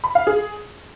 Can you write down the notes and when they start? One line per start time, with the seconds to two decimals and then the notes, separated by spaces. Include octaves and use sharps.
0.04 B5
0.15 F5
0.27 G#4